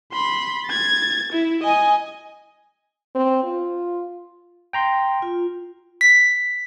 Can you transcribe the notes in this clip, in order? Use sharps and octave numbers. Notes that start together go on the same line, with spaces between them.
B5 C6
G#6 A6
E4
D#5 G#5
C4
F4
G5 A#5 C6
F4
B6